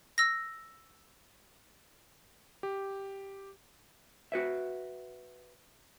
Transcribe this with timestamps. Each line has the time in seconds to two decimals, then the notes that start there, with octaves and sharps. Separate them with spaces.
0.18 E6 A#6
2.63 G4
4.32 F#4 B4 E5